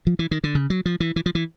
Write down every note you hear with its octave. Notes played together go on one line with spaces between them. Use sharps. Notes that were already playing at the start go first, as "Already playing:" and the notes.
F3
E3
D#3
D3
C#3
F#3
F3
E3
E3
F3
E3